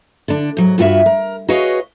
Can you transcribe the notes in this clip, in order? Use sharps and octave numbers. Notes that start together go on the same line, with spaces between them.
D3 D4
G#2 F#3
G2 F4 F#4 A4 E5
A#4
F#4 G#4 B4 C#5 D#5 F5